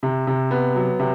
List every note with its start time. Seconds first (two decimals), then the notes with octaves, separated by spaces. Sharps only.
0.03 C3
0.27 C3
0.51 B3
0.75 F#3
0.99 C3